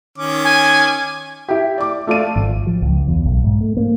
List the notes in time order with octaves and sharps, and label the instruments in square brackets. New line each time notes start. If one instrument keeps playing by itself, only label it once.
[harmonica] D#3 C#4 D6
[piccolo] G#5
[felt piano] E4 G4
D5 D6
A3 F4 D5 D#7
[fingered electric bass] G#1
F3
C#2
E2
B1
G#2
A3
A#3